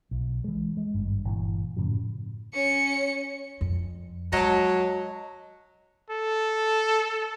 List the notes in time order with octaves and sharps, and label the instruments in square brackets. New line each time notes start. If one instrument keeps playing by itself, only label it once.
[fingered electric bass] B1
E3 G#3
G#3
G#1 G2
G1 A#2 E3
F#2 A2 C#3 F3
[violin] C#4 C#7
[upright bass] F2
[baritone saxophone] F#3 [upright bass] G#3 [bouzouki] D#5 A5
[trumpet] A4